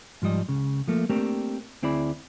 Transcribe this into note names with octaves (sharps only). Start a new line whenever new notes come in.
G#2 F3 G3 D#5
C#2 C#3
F3 A3 A#3
A3 A#3 C4 D4 G4 A#4
D2 C4 E4 G#4 D5 B5